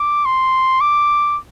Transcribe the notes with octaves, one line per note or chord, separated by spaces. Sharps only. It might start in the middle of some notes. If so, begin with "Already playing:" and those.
Already playing: D6
C6
D6